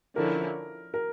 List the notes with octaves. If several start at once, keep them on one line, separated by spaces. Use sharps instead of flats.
D3 F3 C#4 E4 A#4
A#4